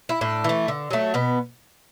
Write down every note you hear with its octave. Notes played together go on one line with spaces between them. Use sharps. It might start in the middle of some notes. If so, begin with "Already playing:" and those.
E4
A2 D4
E3 A3
D3
F#3 A3
B2 B3